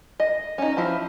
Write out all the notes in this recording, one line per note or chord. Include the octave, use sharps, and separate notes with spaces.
D#5
C#4 D#4
F3 E4 C5